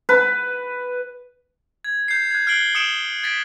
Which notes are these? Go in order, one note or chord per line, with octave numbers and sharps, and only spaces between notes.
B4
G#6
G6 C7
F#6 G#6
F6 G#6 C7 D7 F#7 G7
D#6 C#7 D7 E7 G7
G#6 A6 B6 D7